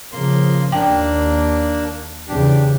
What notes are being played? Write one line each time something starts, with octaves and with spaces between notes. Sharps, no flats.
C#3 F3 A#3 C6
D#2 A#3 D4 G5
E2 C#3 E3 D4 G4